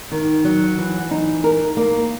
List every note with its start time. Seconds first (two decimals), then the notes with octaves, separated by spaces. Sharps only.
0.12 D#3
0.44 F#3
0.78 E3
1.11 D#4
1.44 A#4
1.77 A#3